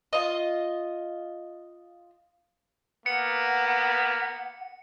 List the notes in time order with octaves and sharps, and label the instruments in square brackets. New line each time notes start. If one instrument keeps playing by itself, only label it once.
[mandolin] F4 D#5
[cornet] A#3 [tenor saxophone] B3 [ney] F#5 [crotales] C#7